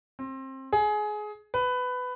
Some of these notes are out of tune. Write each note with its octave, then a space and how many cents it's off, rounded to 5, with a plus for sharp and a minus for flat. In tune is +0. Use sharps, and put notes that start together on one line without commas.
C4 +25
G#4 +20
B4 +15